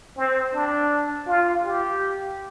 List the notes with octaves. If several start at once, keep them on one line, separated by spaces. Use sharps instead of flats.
C4
D4
F4
G4